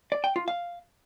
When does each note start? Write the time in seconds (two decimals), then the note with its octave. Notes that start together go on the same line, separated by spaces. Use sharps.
0.12 D5
0.24 G5
0.36 F4
0.48 F5